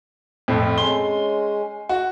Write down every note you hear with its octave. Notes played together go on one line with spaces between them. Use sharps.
F2 A2
G#3 C#4 C6 G7
F#4